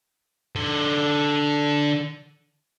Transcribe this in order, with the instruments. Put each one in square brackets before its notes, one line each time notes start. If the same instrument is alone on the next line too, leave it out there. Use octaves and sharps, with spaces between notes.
[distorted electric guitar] D3 C6